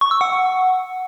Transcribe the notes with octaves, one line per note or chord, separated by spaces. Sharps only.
C#6
E6
F#5